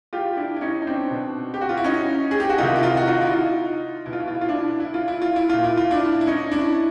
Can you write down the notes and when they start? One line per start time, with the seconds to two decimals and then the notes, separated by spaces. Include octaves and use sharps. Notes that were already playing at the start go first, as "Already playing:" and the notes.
0.13 F4 G4
0.37 D4 E4
0.56 E4
0.61 C#4 D#4
0.82 D#4
0.87 C4 D4
1.11 B2
1.54 G4
1.61 F#4
1.69 F4
1.77 E4
1.84 C#4 D#4
2.31 G#4
2.40 G4
2.49 F#4
2.58 C3 D#3 D#4 F4
2.76 E4
2.83 D#4 F4
2.97 F#4
3.07 D#4 F4
3.22 E4
3.32 D#4 F4
4.06 B2 E4
4.13 F4
4.20 E4
4.28 F4
4.35 E4
4.41 F4
4.48 D4 E4
4.80 E4
4.94 F4
5.08 E4
5.22 F4
5.36 E4
5.50 A#2 F4
5.64 E4
5.77 F4
5.91 D4 E4
6.21 E4
6.27 C#4 D#4
6.51 D4 E4